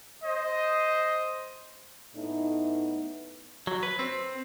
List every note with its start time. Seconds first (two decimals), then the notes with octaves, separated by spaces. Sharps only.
0.24 C5 D#5
2.16 A2 B3 D#4
3.67 F#3
3.83 B4
3.99 C4